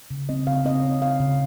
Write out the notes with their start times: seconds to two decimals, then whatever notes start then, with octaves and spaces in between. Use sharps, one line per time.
0.11 C#3
0.29 C4 D#5
0.47 C#3 F5
0.65 C4 D#5
0.83 C4 C#5
1.02 C#3 F5
1.20 C#3